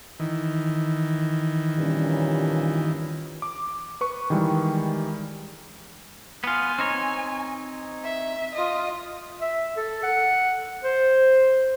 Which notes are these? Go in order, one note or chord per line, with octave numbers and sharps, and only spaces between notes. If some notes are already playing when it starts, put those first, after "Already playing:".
D#3 E3
G2 A#2 C#4
D6
B4 C#6
D#3 E3 G3 G#3
B3 F4 G#5
C4 D#4 C#5
E5
F4 D#5
E5
A4
F#5
C5